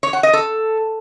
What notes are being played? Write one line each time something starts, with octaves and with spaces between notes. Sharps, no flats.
C#5
F#5
D#5
A4